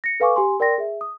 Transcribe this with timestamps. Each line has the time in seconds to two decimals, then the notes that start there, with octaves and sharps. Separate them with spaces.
0.04 A#6 C#7
0.20 A4 B4 F5 G#5 C#6 D6
0.36 G4 G#5 C6
0.60 A#4 D5 G5 C6 A#6
0.78 G#4 E5
1.01 D#6